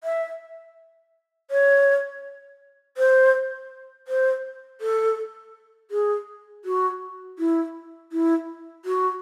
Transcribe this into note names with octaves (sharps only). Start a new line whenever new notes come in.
E5
C#5
C5
C5
A4
G#4
F#4
E4
E4
F#4